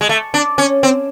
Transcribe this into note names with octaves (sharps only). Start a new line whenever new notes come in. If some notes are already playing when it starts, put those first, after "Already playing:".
G#3
A3
D4
C#4
C4